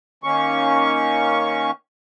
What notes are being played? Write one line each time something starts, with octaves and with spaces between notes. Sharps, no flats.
D#3 A#3 C#4 C#6